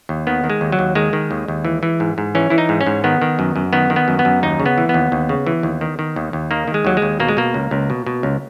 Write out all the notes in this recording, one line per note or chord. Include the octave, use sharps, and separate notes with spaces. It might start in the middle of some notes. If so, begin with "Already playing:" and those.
D#2
D#3 B3
D#3
G#3
D#2
F#3
D#2
D#3 G#3
D#3
D#2
D#2
E3
E3
G#2
G#2
E3 C#4
E3 E4
D#4
G#2
C#4
G#2
D#3 B3
D#3
F#2
F#2
D#3 B3
D#3
B3
F#2
B3
F#2
D#2 D#4
C#3
B3
E3
B3
D#2
D#2
C#3
E3
D#2
D#3
D#3
D#2
D#2
D#3 A#3
D#3
G#3
D#2 F#3
G#3
D#2
B2 A#3
G#3
B2 A#3
C#2
C#2
B2
B2
C#2